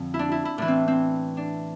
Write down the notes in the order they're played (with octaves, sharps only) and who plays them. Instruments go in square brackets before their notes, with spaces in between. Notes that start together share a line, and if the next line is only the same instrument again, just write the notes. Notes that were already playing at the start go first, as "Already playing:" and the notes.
Already playing: [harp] F2 D3 F3
E4
D4
E4
E4
A2 E3 D4
C4
C4
D4